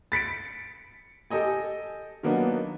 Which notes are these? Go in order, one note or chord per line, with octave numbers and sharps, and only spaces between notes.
A6 B6 C#7 D7
G4 A4 D#5 G#5
D#3 F#3 A#3 B3 D4 D#4